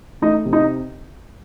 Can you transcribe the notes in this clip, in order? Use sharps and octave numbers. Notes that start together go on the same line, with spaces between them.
A3 D#4 D#5
C3
D#4 D#5